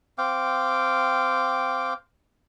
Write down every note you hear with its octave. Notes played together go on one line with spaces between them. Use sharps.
C4 F5 G5 D6